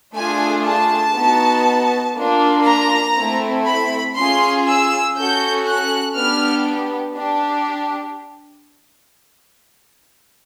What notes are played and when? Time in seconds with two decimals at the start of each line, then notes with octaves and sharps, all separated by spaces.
0.16 A3 D4 F4 G#4 G#5
0.66 A5
1.16 B3 D#4 F#4
2.16 A#3 D4 F4
2.66 A#5
3.16 A3 C4 E4
3.66 B5
4.16 C#4 F4 G#4 C6
4.66 E6
5.16 C#4 F#4 A4 G6
5.66 F#6
6.16 B3 D4 G4 F6
7.16 D4 G4